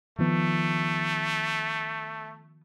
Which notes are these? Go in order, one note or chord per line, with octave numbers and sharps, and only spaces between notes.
D#3 F3 A3 B3